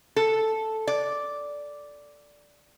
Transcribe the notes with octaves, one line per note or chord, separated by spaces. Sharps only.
A4
D5